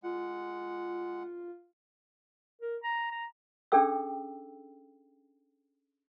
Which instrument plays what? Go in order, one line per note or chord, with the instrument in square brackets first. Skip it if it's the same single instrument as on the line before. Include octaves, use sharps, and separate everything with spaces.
[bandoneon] G#3 F#5 [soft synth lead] F4
[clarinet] A#4
A#5
A#5
[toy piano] C#4 D4 G#4 A4 G5 E6